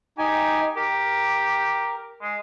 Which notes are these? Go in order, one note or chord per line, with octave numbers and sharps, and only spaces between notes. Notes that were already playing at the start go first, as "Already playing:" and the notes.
D#4 G4 G#5
G4 A#4
G#3